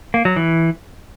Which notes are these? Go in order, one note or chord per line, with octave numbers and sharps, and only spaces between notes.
A#3
F#3
E3